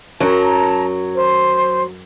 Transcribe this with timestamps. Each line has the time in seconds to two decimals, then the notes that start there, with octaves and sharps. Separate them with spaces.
0.20 F#2 F#3 A5 A#5
1.15 C5